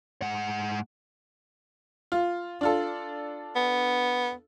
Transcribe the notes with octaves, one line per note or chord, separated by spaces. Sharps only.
G#2 F#5
F4
D4 F4 A4
B3